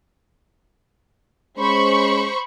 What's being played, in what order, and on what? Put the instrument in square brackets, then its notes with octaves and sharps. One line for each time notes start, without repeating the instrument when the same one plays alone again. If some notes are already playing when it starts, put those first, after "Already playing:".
[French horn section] G#3 C#4 [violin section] C5 B5 C#6